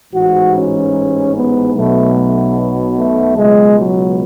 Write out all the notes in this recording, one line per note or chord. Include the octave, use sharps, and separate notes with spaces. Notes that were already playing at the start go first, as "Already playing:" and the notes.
A1 G#2 E3 F#4
C#4
B3
B1 B2 F#3 A3
A3
A3
C#2 B2 F#3 G#3
F#3